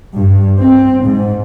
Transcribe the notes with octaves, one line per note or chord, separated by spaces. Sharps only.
G2
C4
G#2